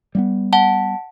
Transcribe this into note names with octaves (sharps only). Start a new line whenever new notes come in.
G3 A#3 B3
F#5 A5